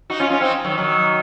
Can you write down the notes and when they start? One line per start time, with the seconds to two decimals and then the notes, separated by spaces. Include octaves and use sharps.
0.10 D#4 F#4
0.19 C#4 F4
0.30 C#4 F4
0.41 C4 D#4
0.64 D#3 F#3
0.78 D#3 F#3